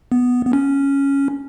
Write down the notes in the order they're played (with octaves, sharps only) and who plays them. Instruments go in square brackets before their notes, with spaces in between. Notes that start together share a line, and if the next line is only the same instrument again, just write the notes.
[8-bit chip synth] B3
B3
C#4